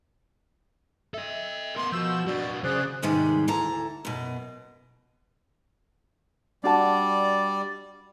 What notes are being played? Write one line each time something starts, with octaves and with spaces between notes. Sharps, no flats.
A4 D#5 E5
B3 A#4 C6
B2 F3 E6 G6
F#3 D4 F#4 D5
C#3 G#4 C5 D5 F#6
G#2 C3 D#3 G3 G#3
D2 E3 A5 A#5
F#2 B2
G3 D4 F#4 D5 A5